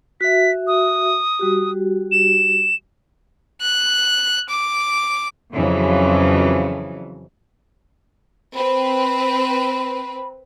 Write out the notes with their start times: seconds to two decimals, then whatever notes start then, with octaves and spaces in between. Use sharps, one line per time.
0.21 F#4 E5 B6
0.67 D#6
1.39 G3 F#4 G4
2.12 E7
3.61 F#6
4.49 D6
5.53 F2 C#3 E3 F#3
8.55 C4 B4 B5